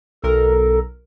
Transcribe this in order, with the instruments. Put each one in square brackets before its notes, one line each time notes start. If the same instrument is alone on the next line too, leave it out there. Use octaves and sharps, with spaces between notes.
[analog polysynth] B1 A#4 [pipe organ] A4